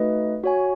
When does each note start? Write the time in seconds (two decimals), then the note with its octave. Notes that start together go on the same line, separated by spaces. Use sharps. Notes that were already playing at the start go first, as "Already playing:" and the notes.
Already playing: A3 D#4 F#4 B4 D#5
0.44 F#4 C#5 G#5